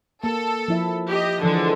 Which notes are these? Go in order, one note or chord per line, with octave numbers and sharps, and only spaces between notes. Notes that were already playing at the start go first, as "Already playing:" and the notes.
A#3 A4
F3 E4 E5
G4 D#5
D3 E3 F3 G#3